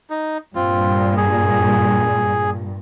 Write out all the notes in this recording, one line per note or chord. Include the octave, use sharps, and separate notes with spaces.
D#4
G2 A#2 C4 F4
G#4